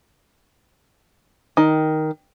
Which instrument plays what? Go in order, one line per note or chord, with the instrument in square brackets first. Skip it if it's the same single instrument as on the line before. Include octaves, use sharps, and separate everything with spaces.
[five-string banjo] D#3